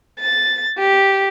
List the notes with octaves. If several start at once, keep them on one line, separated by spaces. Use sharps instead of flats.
A6
G4